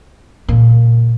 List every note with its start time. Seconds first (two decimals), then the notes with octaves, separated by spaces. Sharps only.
0.48 A#2 C#3